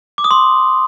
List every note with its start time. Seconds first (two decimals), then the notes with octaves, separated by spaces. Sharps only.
0.18 D6
0.24 D#6
0.31 C6